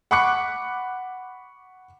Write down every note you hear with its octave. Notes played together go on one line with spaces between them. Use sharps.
F#5 B5 C#6 D6 F#6 C#7